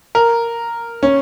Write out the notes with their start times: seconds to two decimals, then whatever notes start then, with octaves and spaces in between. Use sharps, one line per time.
0.15 A#4
1.03 C#4